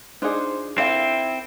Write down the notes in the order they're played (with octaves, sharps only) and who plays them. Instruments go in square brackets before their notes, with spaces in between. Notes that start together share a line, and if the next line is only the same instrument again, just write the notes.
[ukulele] D4 D#4 [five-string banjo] F4 G#4 [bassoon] C5
[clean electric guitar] C4 [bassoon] E4 [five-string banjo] A4 A#4 F5